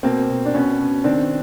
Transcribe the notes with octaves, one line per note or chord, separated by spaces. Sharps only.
B2 A#3 C4
B2
D4
B2 B3 C#4
B2
D#3 C4 D4